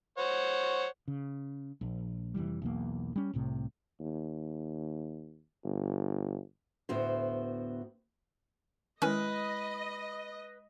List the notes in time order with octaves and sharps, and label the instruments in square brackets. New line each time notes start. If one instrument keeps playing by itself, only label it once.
[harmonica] C5 C#5 F#5
[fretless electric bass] C#3
A#1
F1 B1 E3 G3
B1 E2 A#3
G3 C#4
C2 A2 C3
[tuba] D#2
G1
[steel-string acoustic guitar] D2 A2 B3 F#4 C5
[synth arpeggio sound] D#3 C#4 G#5 [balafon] G#3 E4 [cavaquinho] B4 [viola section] D#5